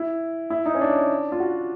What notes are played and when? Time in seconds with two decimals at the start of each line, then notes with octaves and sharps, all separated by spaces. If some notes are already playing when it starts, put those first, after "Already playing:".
Already playing: E4
0.50 E4
0.66 D#4
0.74 C#4
0.81 D4
1.32 F4
1.40 F#4